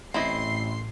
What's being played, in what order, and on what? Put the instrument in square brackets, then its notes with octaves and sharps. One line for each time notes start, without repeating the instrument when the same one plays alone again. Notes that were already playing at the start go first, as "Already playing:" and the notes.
[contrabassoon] A1 [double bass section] A2 [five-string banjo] C4 E4 D#5 [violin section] C6 C7